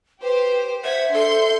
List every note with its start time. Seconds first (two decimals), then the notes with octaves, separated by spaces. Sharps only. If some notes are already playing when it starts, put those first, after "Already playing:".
0.23 G4 B4 C5
0.84 C5 E5 F#5 G#6 B6
1.14 D4 A4 C6 G6